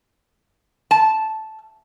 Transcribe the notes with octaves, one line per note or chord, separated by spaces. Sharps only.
A5